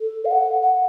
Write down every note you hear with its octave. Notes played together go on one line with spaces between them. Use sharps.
A4
F5
F#5
F#5